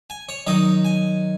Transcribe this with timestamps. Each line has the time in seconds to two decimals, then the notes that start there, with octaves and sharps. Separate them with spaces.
0.10 G#5
0.29 C#5
0.47 D#3 F#3 D#4 D#5
0.85 G#5